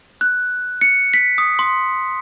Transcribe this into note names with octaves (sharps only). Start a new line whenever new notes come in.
F#6
C#7
B6
D#6
C6